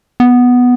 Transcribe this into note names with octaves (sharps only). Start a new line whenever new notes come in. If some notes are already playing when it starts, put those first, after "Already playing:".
B3